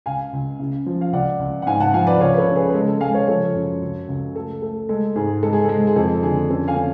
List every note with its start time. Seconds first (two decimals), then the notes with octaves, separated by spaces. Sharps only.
0.06 C#2 F5 G#5
0.33 C#2
0.60 C#3
0.86 F3
1.01 F5
1.13 C#2 D5 F#5
1.39 C#2
1.62 F#5
1.67 G#2 F5 G#5
1.80 F#5 A5
1.94 F3 F5 G#5
2.07 B4 D5
2.20 C#2 C#5 F5
2.34 B4
2.38 A4 C#5
2.48 C#3
2.56 G#4 B4
2.69 B4
2.74 G#3 A4
2.88 A4
3.01 G#3 F5 G#5
3.14 C#5 F5
3.28 F3 A4 C#5
3.55 F#2
3.82 C#2
4.08 C#2
4.35 A3 A4
4.62 A3 A4
4.89 G#3 A4
5.16 G#2 G#4
5.43 G#3 A4
5.53 G#4
5.64 G#3 A4
5.87 G#4
5.96 F2 A4
6.23 D3 G#4
6.50 C#4 A4
6.68 F5 G#5
6.76 C#4